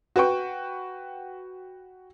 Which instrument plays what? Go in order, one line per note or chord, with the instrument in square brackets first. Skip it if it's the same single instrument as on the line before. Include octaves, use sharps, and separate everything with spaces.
[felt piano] F#4 B4 G5 C#6